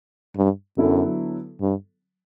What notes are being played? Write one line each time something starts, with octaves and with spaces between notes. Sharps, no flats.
G2
F#2 D3 F#3 B3 E4 A4
G2